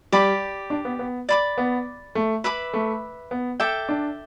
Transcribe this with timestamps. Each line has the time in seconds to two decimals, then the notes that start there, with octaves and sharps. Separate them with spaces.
0.12 G3 G4 D5 B5 D6
0.70 D4
0.85 B3
0.99 B3
1.29 D5 B5 D6
1.58 B3
2.15 A3
2.44 B4 E5 B5 D6
2.73 A3
3.31 B3
3.60 A4 E5 G5 D6
3.89 D4